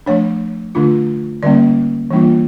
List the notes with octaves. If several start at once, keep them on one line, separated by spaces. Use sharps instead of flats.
F3 A3 D4 C#5
D3 A3 D4 F4
D3 G3 A#3 C#4 D5
E3 G3 A#3 D4 F4